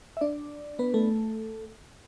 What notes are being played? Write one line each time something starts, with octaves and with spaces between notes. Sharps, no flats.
E5
D4 D5
B3 B4
A3 A4